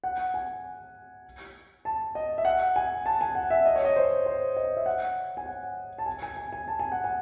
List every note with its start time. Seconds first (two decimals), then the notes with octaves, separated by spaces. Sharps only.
0.04 F#5
0.34 G#5
1.85 A5
2.15 D#5
2.38 E5
2.45 F#5
2.76 G#5
3.06 A5
3.21 G#5
3.35 F#5
3.50 E5
3.66 D#5
3.76 C#5
3.85 D#5
3.96 C5
4.26 C5
4.56 D#5
4.77 E5
4.86 F#5
5.37 G#5
5.46 F#5
5.98 A5
6.06 G#5
6.22 G#5
6.37 G#5
6.53 G#5
6.68 A5
6.79 G#5
6.92 F#5
7.04 G#5